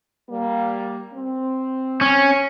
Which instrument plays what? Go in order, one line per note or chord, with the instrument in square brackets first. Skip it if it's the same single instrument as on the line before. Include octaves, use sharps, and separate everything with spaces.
[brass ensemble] G3 A#3
C4
[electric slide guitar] C#4